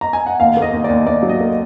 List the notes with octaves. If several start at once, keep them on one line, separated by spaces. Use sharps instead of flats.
A#5
G#5
F#5
D#2 F5
A#3
D#5
D#2
D5
D#2
D#2 D5
F#3
D#5
A#3